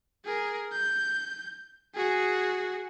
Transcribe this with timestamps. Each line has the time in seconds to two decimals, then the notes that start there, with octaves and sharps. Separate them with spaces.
0.25 G#4 A#4
0.73 G6
1.95 F#4 G#4